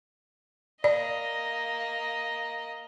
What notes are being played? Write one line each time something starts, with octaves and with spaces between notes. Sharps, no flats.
A#3 D5 D#5